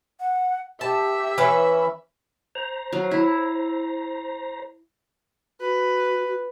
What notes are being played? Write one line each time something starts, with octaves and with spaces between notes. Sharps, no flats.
F#5
G4 E5 A5
E3 C#4 B4
C5 A#5
F#3 F5
E4
F#4 B4